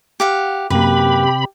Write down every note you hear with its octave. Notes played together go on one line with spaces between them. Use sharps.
G4 F5 F#5
F#2 C3 A#3 G4 B4 B5